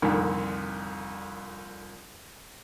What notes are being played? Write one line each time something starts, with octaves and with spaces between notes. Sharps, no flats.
C2 F2 A#2 D3 D#3